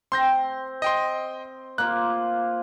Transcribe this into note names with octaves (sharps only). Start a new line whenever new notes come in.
C4 C6 G6 A#6
D#5 G5 C6
A#3 F4 C5 F#6